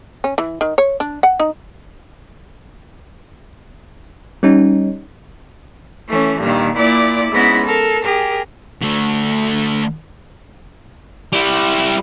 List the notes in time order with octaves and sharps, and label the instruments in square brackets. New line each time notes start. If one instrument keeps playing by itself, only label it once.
[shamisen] C#4
E3
D#3
C#5
D4
F#5
D#4
[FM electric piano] G3 C#4 D#4
[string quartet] E3 A3 C#4
G2 A#2 D#3
A#2 E4 D5 D6
G#2 B3 C#4 E4 B5 A#6
A4 A#4
G4 G#4 A#4
[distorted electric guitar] D3 A3
G3 E4